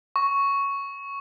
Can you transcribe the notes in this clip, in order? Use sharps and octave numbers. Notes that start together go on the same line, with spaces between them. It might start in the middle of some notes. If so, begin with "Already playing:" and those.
C#6